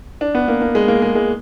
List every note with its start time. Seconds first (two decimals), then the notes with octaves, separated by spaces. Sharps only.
0.21 D4
0.35 B3
0.48 A#3
0.62 A#3
0.75 G#3
0.88 A#3
1.02 G#3
1.15 G#3